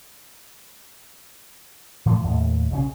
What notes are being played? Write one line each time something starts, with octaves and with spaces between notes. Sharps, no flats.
A2 E3 F3 A3
D#2 A2
B1 C#3 E3 C#4